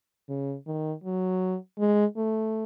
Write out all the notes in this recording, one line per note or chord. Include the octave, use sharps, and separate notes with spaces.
C#3
D#3
F#3
G#3
A3